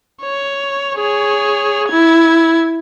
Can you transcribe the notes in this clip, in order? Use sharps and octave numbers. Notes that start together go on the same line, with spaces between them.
C#5
G#4 C#5
E4 G#6